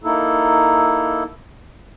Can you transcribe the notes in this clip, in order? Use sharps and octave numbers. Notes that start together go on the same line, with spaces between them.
A#3 D#4 E4 A4